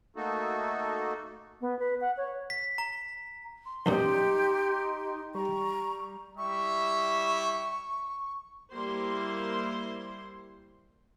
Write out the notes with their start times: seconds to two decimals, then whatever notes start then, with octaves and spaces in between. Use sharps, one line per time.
0.16 A3 A#3 D#4 F#4 A4
1.61 B3
1.79 B4
2.01 F#5
2.17 C#5
2.50 B6
2.78 A#5
3.66 C6
3.86 B1 F#2 A#2 D#4 G4
5.35 G3 A#5 C#6
6.38 G3 E4 E5 C#6
8.73 G3 A#3 E4 C5 C6